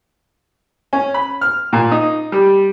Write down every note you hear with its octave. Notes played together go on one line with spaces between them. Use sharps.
C#4
B5
F6
A#2
D#4
G3